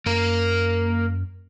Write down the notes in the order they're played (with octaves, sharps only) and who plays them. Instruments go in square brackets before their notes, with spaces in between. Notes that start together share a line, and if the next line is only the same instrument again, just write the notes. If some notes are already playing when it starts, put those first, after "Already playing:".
[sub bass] F#2 [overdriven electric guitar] A#3 A#4